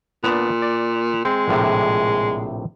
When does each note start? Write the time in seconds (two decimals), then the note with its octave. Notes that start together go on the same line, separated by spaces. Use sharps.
0.24 A#2 B3 D4
0.62 D5
1.25 G#3 C4
1.48 A#1 A2 C3